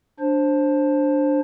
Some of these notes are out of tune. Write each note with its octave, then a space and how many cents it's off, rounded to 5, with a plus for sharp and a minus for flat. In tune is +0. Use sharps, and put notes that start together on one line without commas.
D4 +0 C5 +15